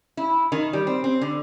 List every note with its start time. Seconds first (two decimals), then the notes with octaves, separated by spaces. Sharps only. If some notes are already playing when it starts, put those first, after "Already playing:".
0.17 E4
0.52 D#3
0.73 G3
0.87 C4
1.04 C4
1.21 D3